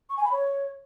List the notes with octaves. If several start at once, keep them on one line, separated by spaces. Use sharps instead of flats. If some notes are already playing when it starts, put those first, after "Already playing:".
C#6
G#5
B5
C#5